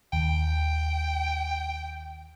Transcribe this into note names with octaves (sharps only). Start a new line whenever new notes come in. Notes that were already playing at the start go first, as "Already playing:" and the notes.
D#2 G5